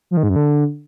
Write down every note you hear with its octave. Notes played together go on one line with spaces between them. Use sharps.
F3
D#3
G#2
F#2
D3